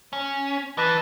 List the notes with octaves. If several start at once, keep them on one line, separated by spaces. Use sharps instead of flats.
C#4
E3 B4 D#5 A5